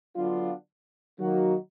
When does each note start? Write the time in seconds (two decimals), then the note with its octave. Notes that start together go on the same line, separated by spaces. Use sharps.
0.16 D3 F#3 B3 D4 F4
1.19 D#3 F#3 A#3 D#4 F#4